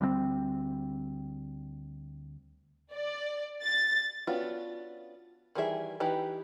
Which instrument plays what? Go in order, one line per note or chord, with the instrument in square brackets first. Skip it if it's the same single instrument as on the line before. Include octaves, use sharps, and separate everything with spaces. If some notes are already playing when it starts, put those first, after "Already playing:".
[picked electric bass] D2 G3 A#3 C4
[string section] D5
A6
[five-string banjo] B3 C#4 D4 F4 F#4
D#3 E3 G3 G#4 E5
E3 D#4 G4 B4 A#5